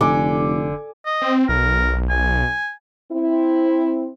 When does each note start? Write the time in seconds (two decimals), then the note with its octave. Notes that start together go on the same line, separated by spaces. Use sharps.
0.01 F1 D3 G#5 D6
1.06 D#5
1.22 C4
1.49 B1 A#4
2.10 G#5
3.11 C4 E4